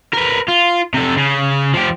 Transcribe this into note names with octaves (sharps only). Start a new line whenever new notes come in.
A#4 B4
F4
C3 A4
C#3
F3 G4